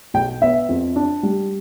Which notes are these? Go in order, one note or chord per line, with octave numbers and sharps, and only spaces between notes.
B1 G5
B3 E5
F2
D4
G3